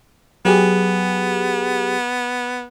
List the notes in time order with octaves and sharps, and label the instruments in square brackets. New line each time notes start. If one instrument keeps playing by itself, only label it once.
[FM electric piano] F#3 G4 G#4 [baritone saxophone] B3